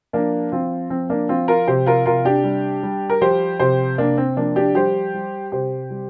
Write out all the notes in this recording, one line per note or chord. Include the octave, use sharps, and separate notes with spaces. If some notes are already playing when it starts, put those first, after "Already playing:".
F3 A#3 D4
F3 C4 F4
F3 C4
A#3 D4
F3 C4 F4
F4 A#4
C3 G4 C5
F4 A#4
C3 F4 A#4
D4 G4
G3
G3
A#4
F3 G4 C5
C3 G4 C5
C3 A#3 D4
C4
F3 A#3 D4
D4 G4
G3 G4 C5
G3
C3 G4 C5
G3